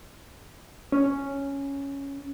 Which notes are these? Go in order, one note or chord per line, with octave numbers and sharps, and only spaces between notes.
C#4